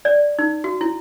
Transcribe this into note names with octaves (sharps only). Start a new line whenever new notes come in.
D5
D#4
F#4
E4